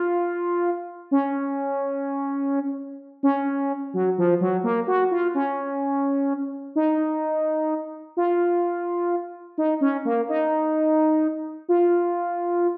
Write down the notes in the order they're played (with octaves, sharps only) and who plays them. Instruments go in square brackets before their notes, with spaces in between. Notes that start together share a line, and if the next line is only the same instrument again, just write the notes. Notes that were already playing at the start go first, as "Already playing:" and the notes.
Already playing: [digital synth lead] F4
C#4
C#4
F#3
F3
F#3
A#3
F#4
F4
C#4
D#4
F4
D#4
C#4
A#3
D#4
F4